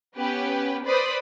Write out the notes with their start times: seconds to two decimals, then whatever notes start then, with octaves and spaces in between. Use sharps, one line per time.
0.17 B3 C#4 G4 B4
0.86 B4 C5 D5 B5 D#6